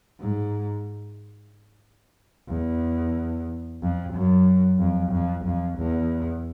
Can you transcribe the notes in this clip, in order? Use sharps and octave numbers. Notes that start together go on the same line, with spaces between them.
G#2
E2
F2
F#2
F2
F2
F2
E2